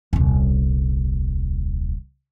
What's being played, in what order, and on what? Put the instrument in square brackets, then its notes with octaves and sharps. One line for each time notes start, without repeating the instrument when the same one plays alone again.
[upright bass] D#1 C2